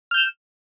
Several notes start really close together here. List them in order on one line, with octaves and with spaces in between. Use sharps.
F6 G6 E7